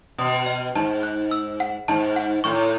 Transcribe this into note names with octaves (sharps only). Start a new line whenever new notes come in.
B2 D#6
D#5
G#2 A5
F#6
E6
F#5
G#2 A5
F#5
A2 C#6